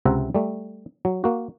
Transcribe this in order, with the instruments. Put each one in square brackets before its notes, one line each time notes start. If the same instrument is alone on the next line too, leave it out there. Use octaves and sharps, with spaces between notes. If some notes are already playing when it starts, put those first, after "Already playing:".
[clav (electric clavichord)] C#2 C3 C4 E5 F#5 A#5
G3 A3
F#3
A#3 F#4